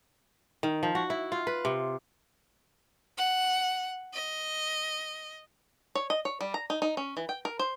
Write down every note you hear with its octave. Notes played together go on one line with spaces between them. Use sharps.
D#3
F3
F#4
E4
F4
B4
C3
F#5
D#5
C#5
D#5
C#5
G3
A#5
D#4
D#4
C#4
E3
G5
A#4
C5